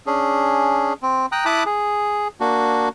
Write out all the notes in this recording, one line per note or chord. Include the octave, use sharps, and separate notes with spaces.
C#4 D4 G#4
C4
G5 A#5 D#6 F#6
E4 A5 B5 D6 D#6 F#6
G#4
A#3 D4 F#4